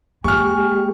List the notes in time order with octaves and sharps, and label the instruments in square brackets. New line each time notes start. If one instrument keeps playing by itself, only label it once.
[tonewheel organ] G#3 G4 [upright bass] A#3 [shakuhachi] G#5 [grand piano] C#6 F6